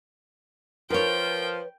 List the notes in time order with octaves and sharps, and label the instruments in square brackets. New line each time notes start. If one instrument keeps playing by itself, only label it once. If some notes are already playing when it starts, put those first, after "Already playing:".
[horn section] F3 [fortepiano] A#4 [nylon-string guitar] B4 C#5 [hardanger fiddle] G5